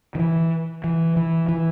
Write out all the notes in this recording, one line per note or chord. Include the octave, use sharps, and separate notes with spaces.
D#3
E3
E3
E3
E3